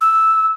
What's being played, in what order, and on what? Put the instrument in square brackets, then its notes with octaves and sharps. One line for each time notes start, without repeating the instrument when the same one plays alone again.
[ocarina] E6